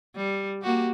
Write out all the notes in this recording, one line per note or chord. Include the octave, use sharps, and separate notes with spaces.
G3
A#3 F#4 G4